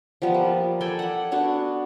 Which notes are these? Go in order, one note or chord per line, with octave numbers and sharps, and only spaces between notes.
F3 G3 B3
A#3
A4 D5 G5 G#5
F#5 B5
B3 D4 F#4